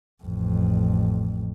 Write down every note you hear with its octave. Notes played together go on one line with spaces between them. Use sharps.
A1 F2